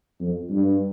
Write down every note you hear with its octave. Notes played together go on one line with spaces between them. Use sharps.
F2
G2